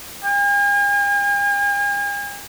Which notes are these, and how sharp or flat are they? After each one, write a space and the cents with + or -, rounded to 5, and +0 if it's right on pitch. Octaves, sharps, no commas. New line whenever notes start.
G#5 -45